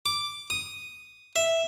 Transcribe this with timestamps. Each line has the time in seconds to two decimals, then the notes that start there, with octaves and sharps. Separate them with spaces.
0.06 D6
0.50 D#6
1.36 E5